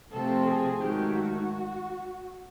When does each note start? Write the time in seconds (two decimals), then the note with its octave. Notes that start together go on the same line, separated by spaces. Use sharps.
0.11 C3 F3 A3 C4 F4 A4
0.46 G#4
0.80 G#2 D#3 F#3 A3 G4
1.15 F#4